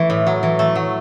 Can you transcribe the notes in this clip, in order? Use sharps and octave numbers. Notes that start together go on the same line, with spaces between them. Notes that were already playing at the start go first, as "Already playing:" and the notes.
Already playing: E3 A3
A2
F#3
E3
A3
F#3